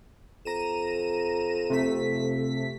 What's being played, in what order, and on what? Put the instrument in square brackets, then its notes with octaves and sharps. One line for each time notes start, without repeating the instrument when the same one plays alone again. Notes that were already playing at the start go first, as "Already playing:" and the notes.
[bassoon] F2 [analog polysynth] A#5 D#7 E7
[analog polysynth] C3 A3 B6